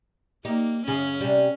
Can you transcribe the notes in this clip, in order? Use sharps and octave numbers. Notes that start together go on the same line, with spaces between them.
A#3 D#4 G4
F#2 C#3 C#4 G#4
C3 G3